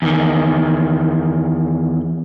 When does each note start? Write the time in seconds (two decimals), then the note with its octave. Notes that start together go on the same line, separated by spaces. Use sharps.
0.02 E2 D#3